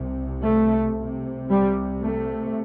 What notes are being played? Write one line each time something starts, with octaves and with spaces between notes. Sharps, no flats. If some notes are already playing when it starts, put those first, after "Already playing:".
Already playing: C2 C3
A3
C2 C3
G3
A3